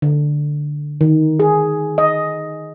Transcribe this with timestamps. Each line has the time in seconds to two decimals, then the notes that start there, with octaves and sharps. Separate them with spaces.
0.02 D3
1.01 D#3
1.40 G#4
1.98 D#5